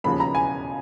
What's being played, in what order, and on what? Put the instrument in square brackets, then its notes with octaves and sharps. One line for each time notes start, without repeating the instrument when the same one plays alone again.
[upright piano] E1 D#2 C#3 F3 B5
A#5
G#5